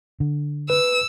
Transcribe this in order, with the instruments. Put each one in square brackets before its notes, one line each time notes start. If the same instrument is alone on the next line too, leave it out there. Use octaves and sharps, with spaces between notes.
[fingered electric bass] D3
[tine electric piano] B4 [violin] E6